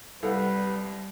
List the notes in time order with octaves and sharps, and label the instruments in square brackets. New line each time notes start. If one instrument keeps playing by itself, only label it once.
[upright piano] C2 [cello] G3 [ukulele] A4 F5 F#5 [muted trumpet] B4